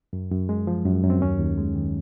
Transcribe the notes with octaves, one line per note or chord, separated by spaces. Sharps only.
F#2
F#2
G#3
F3
F#2
F#2
C4
D#2 C#4
D#2
G#3
D#3